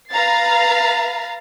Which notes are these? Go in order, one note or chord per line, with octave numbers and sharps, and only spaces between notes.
B4 F5 A#5 A6 C7